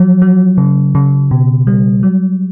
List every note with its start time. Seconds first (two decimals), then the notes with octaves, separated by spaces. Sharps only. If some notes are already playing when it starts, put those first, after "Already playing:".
Already playing: F3 F#3
0.22 F#3
0.58 C#3
0.95 C#3
1.31 B2
1.67 G3
2.03 F#3